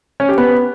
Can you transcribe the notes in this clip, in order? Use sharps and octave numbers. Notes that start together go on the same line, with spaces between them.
C#4
G4
B3